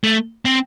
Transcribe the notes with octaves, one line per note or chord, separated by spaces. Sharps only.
A3
C4